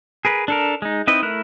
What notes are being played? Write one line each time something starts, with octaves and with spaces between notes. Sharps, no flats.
G#4 A#4 B4
D4 A4 A#4
G#3 D#4
C4 D#4 E4 B4 D#5
A3 E4 A#4 F#6